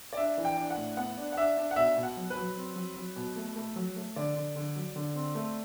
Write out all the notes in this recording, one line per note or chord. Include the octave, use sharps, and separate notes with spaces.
D5
D4 E5
E3
G5
D4
F#5
A2
B3 F#5
D4
F#5
D4 E5
D4
F#5
B2 E5
B2
F#5
F#3
B4
F#3
C4
F#3
F#3
B2
A3
A3
F#3
A3
D3 D5
D3
D3
F#3
D3
C4
A3